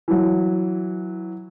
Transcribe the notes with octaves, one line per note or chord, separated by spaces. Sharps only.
E3 F#3